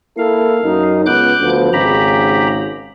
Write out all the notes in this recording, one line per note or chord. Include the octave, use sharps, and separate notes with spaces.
A#3 E4 A4 F5
F#2 D#4
C#2 B3 D6 F#6 G6
D2 F3 B3
G#1 G#2 C#3 G4 A#5 B5